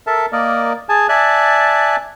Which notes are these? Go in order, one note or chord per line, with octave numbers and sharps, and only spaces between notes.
A4 A#4 E5 A5
A#3 A#4 D5 D#5
G#4 G#5 A5
D5 E5 G#5 A5 F#6